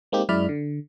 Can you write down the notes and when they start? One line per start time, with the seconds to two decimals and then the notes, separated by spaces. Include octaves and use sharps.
0.12 G#3 A#3 C4 D#4 G4
0.29 F#2 G#3 E4 D5 B5 F6
0.49 D3